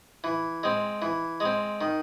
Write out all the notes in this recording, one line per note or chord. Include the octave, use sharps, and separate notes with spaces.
E3
G#3 C4
E3
G#3 C4
D#3